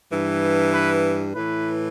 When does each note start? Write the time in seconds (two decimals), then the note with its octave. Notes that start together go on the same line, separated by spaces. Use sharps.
0.09 G2 E3
0.71 B4
1.33 A2 E3 B4